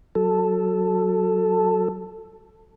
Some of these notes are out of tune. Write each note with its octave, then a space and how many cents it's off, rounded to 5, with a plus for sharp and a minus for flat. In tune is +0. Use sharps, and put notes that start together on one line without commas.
F#3 +0 A4 +5